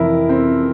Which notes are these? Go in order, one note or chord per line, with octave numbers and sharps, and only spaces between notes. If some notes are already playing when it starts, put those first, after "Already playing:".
Already playing: F2 C3 E3 E4 A#4
C4